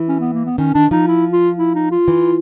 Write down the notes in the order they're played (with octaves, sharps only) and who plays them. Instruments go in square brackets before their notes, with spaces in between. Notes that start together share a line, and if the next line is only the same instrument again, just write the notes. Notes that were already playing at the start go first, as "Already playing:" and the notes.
Already playing: [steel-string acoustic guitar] E3
[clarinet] C#4
B3
A#3
B3
[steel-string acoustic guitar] D#3 [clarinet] C#4
[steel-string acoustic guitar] D#3 [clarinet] D4
[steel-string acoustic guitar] F3 [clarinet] D#4
[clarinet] E4
F4
E4
D#4
F4
[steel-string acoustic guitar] E3